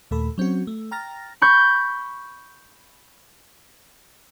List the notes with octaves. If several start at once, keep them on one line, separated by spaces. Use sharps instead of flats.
D#2 A#2 A3 A4 B5
F#3 C4 C#4 F#4
A3
G5 A#5 F6 A6 A#6
B5 C#6 G6